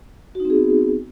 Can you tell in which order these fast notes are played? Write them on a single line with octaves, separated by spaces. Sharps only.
F#4 D#4 C4 G#4 B3